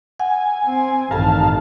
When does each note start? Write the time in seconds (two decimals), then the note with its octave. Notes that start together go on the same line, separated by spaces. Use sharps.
0.20 F#5 G#5
0.66 C4
1.11 A1 G2 D#3 A4 F5 A5